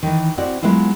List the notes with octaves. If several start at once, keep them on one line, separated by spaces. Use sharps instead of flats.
D#3 E3
C4 E4 F#4 D5
F#3 G#3 B3 E4 F4